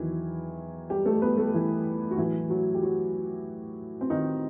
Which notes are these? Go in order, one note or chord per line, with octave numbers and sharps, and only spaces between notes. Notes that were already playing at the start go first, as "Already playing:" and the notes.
Already playing: E2 D#3 E3 F#3 E4
G3 G4
A3 A4
B3 B4
A3 A4
E3 E4
F#4
A2 E3 F#3 E4
F#3 F#4
G4
F#3 F#4
C4
D#3 D#4